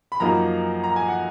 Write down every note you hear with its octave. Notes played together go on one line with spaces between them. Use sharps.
B5
F#2 F3 A#3 D#4 A#5
A#5
G#5
F#5